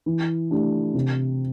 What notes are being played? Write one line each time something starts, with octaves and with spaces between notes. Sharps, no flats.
E3
A3 D4 G4
C3